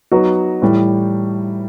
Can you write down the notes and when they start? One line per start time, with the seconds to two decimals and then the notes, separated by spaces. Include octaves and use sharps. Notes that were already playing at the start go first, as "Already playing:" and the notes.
0.12 F#3 B3 D#4 F#4
0.62 A2 E3 G3